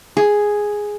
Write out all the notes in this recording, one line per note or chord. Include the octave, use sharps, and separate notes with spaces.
G#4